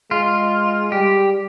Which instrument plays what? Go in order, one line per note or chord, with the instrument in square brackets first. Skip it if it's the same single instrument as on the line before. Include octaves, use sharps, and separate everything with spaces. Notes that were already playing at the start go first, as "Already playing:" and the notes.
[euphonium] G#3 [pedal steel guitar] F4
[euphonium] G3 [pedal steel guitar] G4